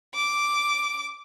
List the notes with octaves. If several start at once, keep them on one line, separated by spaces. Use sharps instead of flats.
D6